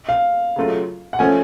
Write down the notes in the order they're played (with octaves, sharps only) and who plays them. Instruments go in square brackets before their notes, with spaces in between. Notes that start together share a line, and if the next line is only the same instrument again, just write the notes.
[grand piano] F5
[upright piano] C#3 F#3 A3 F4
[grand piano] F#5
[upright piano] F3 A3 C#4 [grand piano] G#5